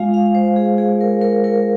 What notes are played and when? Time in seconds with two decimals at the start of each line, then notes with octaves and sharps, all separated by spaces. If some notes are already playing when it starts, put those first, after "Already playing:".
Already playing: G#3 F4 F5
0.14 F5
0.35 C5
0.56 G#4
0.78 G#4
1.01 A#4
1.22 A#4
1.44 A#4